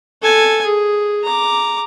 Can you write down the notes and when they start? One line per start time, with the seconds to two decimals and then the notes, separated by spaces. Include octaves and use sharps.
0.22 A4 G#5
0.64 G#4
1.23 A#5 D6